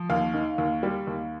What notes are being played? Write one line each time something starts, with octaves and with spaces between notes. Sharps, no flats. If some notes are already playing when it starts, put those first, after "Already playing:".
Already playing: F3
D#2 F5
D#3
D#2
G3
D#2